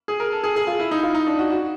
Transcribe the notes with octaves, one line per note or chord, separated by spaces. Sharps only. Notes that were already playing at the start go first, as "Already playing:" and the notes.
G#4
A#4
A4
G#4
G#4
F4
E4
D#4
F4
D#4
D4
F#4
F#4